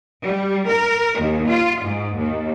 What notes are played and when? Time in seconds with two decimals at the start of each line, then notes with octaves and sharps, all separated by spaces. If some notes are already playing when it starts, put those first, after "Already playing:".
0.24 G3
0.67 A#4
1.20 D#2
1.49 F4
1.84 G#2
2.18 D#2